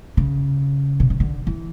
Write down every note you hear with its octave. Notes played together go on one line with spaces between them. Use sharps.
C#3
B2
C#3
D3
E3